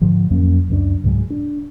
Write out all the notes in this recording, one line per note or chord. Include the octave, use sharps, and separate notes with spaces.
G#2 D3 F3
F2 F#3 A#3 C#4
C#2 F#2 G#3 D4
C#2 G#2 F#3 G#3
D4